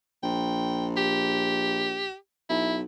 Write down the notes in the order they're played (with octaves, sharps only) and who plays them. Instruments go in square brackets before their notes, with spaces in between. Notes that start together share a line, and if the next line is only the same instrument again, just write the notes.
[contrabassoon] A#1 [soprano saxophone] G5
[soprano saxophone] G4
[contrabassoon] B1 [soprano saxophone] E4